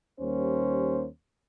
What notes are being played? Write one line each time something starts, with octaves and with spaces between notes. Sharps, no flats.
D#2 G3 A#3 C#4 C5